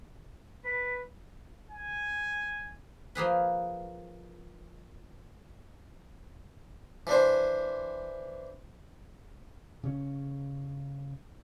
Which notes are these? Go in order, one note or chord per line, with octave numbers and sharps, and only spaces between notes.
B4 B6
G#5
F3 A#3 G#4 B4
E3 D4 C5
C#3 C#4